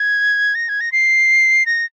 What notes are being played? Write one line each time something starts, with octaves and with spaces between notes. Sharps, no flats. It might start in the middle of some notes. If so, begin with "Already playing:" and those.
Already playing: G#6
A#6
G#6
A#6
C7
A#6